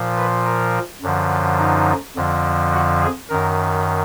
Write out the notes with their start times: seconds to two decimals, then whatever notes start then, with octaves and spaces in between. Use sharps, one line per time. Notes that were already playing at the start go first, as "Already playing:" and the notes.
Already playing: A#2 F3
0.17 B4
0.45 A#4
1.02 F#2 D3 F3
1.59 D#4
2.16 F2 D3 F3
2.72 F#4
3.01 G#4
3.29 F#2 D#3 A#4